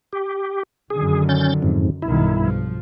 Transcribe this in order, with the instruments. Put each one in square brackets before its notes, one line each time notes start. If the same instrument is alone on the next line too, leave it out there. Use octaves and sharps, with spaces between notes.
[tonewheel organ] G4
[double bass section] F#2 D3 D#3 [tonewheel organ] G#4
[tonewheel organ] C#4 G6 A6
F2 G#2
[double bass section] B1 G2 D#3 [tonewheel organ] E4
[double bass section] F3